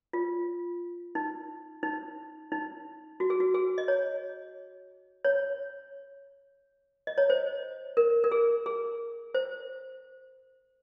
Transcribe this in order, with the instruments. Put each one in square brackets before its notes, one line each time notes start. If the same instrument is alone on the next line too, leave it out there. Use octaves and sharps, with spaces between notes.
[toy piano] F4
D#4
D#4
D#4
F#4
G#4
F#4
G#4
D#5
C#5
C#5
D#5
C#5
C5
A#4
A#4
G#4
G#4
C5